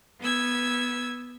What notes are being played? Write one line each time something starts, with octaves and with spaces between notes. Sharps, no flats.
B3 E6 G#6